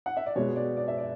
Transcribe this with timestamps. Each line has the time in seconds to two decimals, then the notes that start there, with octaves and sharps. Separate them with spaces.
0.06 F#5
0.17 E5
0.26 D5
0.36 B2 G#3 B3 C#5
0.56 D5
0.77 D5
0.88 E5
0.98 D5